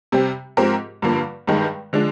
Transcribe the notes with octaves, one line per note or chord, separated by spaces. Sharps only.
C3 G3 C4 G4
G#2 F3 C4 G4 A#4
G2 D3 F3 A#3
G2 D#3 G#3 D#4
D3 F3 G#3 D4